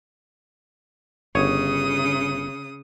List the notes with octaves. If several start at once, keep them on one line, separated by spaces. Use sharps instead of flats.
G1 C#3 C#5 D#6